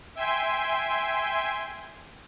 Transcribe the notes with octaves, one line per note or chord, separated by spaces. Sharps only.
E5 G5 G#5 C6